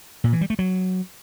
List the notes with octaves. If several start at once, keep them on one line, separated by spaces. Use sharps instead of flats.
A#2
E3
G3
A3
F#3